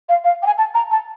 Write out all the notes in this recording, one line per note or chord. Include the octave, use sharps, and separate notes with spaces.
F5
F5
G5
G#5
A5
A#5
A5